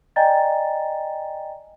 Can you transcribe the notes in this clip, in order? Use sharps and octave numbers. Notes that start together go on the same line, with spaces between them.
D5 D#5 G5 G#5 A#5 A6